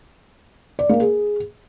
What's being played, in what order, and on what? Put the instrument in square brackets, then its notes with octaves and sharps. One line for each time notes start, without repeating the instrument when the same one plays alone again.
[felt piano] D5
A#3
G#4